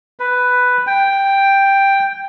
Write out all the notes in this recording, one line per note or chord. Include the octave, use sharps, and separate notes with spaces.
B4
G5